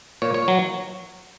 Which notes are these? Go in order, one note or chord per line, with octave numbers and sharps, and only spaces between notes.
A#2 C#5
C#5
F#3